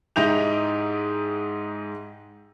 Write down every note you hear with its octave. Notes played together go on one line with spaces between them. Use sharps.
G#2 D#4 E4 G4 G6 F7